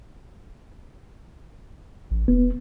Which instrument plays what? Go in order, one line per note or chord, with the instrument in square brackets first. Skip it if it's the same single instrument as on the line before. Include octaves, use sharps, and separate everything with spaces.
[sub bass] A1
[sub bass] E1 [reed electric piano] B3